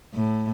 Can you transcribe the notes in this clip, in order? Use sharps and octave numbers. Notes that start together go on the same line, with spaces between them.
A2